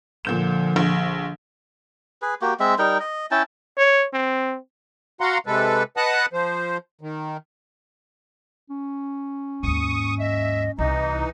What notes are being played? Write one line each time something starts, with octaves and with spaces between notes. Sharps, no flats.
A#2 D3 F3 G6 E7
A#1
G#4 B4
A#3 F#4 G4
G#3 C4 E5
G3 D#4 A#4 G5
D#5
C#4 E4 G5 A5
C#5
C4
F#4 F5 F#5 A#5 C6
C3 G#3 A4 B4
B4 D#5 F#5 A5 D#6 F#6
F3 C5
D#3
C#4
D#2 G#2 C#6 D#6
D#5 E5
C2 E3 D#4 D#5